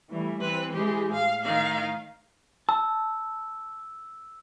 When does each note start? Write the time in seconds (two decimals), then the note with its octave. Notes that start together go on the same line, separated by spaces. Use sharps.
0.10 E3 G3 A3
0.41 E3 C4 B4
0.73 E3 G#3 G4 G#4
1.13 A2 F5
1.44 D#3 F5
2.69 A5 E6